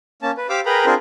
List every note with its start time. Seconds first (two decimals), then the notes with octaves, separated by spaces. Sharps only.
0.22 A#3 C#4 A5
0.37 B4
0.49 G4 C5 F5 D6 E6
0.66 G#4 A#4 B4 G5 A#5 B5
0.86 C4 D4 F4 G#4 A#4 C5